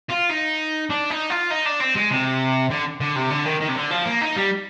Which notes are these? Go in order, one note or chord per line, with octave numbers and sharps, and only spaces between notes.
F4
D#4
D4
D#4
F4
D#4
D4
C4
G#3
C3
D3
D3
C3
D3
D#3
D#3
C3
D3
F3
A#3
D#4
G3